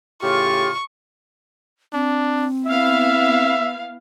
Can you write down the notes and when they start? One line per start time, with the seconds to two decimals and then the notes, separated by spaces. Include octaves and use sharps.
0.23 A2 C#3 F4 G4 C#6
1.93 C4 D4
2.66 B3 E4 E5 F5